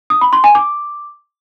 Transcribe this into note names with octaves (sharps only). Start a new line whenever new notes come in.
D#6
B5
C6
G#5
D6